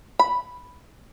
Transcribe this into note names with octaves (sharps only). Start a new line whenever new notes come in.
B5